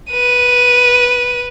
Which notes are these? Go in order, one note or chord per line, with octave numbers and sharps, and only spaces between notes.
B4 D#7